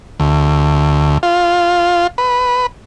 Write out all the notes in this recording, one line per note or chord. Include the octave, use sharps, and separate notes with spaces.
D2
F4
B4